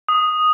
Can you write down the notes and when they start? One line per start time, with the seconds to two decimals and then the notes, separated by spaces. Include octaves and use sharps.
0.09 D#6